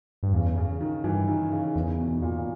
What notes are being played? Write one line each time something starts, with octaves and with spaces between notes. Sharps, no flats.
G2
E2 C#3
C#3
D#3
G2 E3
D#3
C#3
E2
B2
A#2
A#2